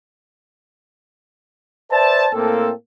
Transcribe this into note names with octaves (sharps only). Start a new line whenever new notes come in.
B4 C5 D5 E5 A5
A2 A#3 C4 A4